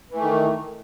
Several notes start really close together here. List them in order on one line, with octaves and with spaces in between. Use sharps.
E3 A3 D#3